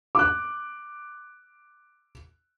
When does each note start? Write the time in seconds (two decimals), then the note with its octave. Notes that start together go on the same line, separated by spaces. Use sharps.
0.15 D6 F#6